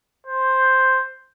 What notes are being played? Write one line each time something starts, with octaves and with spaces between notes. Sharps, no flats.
C5